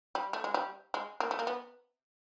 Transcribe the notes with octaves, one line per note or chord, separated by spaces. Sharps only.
G3
A3
G#3
G3
G#3
A#3
A3
A#3
B3